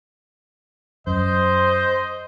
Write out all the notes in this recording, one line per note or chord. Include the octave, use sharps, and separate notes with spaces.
F#2 C5 D#5